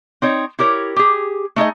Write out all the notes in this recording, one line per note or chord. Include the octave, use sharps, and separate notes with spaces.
C4 D#4 C#5
E4 G4 A#4 C#5
G4 G#4
A3 D#4 G#4 D#5